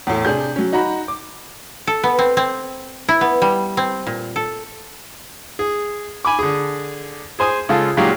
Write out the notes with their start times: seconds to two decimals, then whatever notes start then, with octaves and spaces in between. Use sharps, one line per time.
0.07 E2 A2
0.25 C3 D4 G#4 G6
0.56 F#3 C#4
0.73 D#4 F#4 A#5 B5
1.08 D6
1.87 A4
2.04 B3
2.19 C4
2.37 C4
3.09 E4
3.21 B3
3.42 G3
3.77 C4
4.07 A#2
4.36 A4
5.59 G#4
6.25 G#5 B5 D6
6.39 D3 G#4
7.39 G#4 C5 G#5 D#6
7.69 C#3 G#3 F4 A4
7.97 A#2 F#3 G#3 G4 F5